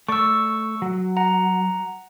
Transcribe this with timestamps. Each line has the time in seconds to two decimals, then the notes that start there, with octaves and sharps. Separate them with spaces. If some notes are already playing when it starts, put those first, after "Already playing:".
0.08 A3 D5 C#6 E6
0.82 F#3
1.17 F#5 A#5